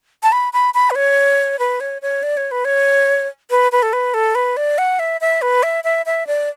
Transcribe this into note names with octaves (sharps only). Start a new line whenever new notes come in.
A5
B5
B5
B5
B4
C#5
B4
C#5
C#5
D5
C#5
B4
C#5
B4
B4
A4
B4
A4
B4
D5
F#5
E5
E5
B4
E5
E5
E5
D5